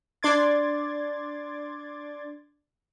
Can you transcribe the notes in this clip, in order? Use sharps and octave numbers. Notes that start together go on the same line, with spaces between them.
D4 D5 C6 D6 G#6 A6